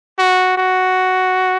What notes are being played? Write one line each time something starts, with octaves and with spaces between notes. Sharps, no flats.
F#4
F#4